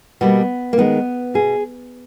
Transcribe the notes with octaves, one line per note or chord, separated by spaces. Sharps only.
B2 G3 A#3 B3
A#3
D#3 G#3 B3
B2 G#4